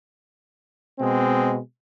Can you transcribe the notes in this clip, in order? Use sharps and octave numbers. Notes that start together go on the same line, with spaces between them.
B2 G#3 C4